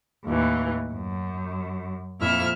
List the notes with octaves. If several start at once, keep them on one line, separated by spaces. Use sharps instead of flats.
D#2 A2 E3
F#2
F2 A#2 F3 E4 E5 F6